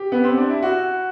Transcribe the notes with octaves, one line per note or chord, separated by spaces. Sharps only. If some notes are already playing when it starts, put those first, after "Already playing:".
Already playing: G4
B3
C4
D4
E4
F#4